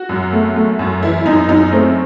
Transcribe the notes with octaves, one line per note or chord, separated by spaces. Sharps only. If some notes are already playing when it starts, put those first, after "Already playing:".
Already playing: F#4
F#2
A3
A3
F#2
E3 E4
F#2 D#4
F#2 D#4
A3 C4